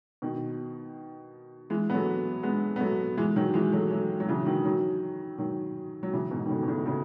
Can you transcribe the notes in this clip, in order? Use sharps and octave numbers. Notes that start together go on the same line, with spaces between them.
B2 D#3
E3 G#3
B3
F#3 A3
G#3 B3
B3
F#3 A3
E3 G#3
D#3 F#3
E3 G#3
F#3 A3
F#3 A3
F#3
C#3 E3
D#3 F#3
D#3 F#3
D#3 F#3
F#3
C#3 E3
G#2 B2
D#3
A2 C#3
B2
A2 C#3
A2 C#3